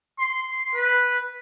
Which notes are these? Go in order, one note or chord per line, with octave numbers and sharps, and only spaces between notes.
C6
B4